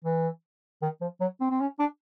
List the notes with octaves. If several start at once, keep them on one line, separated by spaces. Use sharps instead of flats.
E3
D#3
F3
F#3
C4
C4
C#4
D4